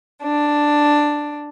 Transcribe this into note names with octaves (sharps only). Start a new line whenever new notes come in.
D4